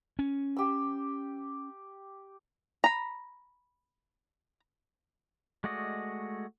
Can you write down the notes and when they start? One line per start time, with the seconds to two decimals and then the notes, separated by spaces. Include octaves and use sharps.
0.19 C#4
0.56 G4 E6
2.84 A#5 B5
5.64 G#3 A3 F#4 D5 D#5